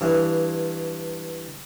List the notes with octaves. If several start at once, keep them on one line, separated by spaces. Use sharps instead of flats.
G2 E3